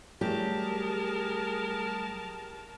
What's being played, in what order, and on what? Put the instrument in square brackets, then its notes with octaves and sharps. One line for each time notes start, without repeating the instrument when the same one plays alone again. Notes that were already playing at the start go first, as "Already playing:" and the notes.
[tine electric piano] F#3 G3 A3 [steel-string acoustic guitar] G4 [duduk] G#4 [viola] A#4 A5